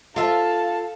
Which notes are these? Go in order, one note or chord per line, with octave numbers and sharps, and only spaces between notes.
F4 A4 E5 F5 A5